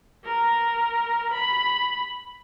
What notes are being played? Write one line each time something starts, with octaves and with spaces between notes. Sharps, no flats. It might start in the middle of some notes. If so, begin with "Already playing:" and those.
A#4
B5